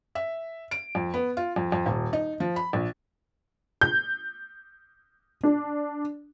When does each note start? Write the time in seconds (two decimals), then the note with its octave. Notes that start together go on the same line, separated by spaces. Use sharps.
0.15 E5
0.71 D7
0.95 F2
1.14 B3
1.37 F4
1.56 F2
1.72 F2
1.86 D#1
2.13 D#4
2.40 F3
2.56 B5
2.73 A#1
3.81 G6
5.43 D4